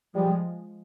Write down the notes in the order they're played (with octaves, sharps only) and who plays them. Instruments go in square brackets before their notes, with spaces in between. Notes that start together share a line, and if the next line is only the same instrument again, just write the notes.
[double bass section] F3 G#3 [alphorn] G3